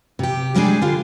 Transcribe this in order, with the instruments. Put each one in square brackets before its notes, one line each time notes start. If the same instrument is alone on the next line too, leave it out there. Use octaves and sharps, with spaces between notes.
[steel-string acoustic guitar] C3 G4
G3 G#3 D4 G4 G#4 G#5
D3 F4